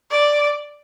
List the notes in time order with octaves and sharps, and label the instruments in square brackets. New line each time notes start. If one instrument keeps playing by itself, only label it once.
[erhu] D5